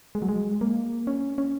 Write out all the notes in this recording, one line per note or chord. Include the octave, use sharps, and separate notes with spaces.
G#3
F#3
G#3
A#3
C#4
C#4